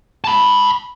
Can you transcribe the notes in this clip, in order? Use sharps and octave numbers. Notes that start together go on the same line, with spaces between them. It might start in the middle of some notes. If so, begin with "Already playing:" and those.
A5 B5